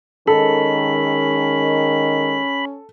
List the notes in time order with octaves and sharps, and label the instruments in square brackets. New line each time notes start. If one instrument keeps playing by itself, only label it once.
[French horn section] D#3 G#3 [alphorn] C#4 [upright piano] A4 [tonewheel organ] B5